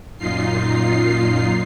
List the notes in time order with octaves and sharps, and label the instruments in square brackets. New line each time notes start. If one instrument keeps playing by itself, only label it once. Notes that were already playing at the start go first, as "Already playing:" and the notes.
[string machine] F#2 A#2 D#4 F4 C7